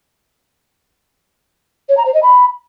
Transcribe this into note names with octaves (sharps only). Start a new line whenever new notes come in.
C#5
A#5
C5
D#5
B5